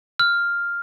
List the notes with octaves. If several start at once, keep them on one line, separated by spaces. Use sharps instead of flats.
F6